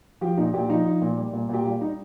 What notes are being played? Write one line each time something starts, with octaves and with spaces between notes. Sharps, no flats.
F3 G4
A#2 D#4
A#2 G4
F3 D#4
F3
A#2
G3
A#2
A#2 G4
G3 F4
G3 D#4